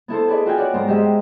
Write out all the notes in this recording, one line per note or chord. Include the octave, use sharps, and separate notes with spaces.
B3 E4 A4 C5
G#4 B4 D5 D#5
F4 F#4 F5 G5 G#5
C#5 D5 F#5
G#2 B3 A#4 C5 A#5
G#3 G4 D#5 E5